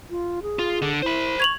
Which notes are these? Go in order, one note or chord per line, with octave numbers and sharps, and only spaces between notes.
F4
G#4
F4
D3
E4 C5 B5
C#6 G#6 F7 F#7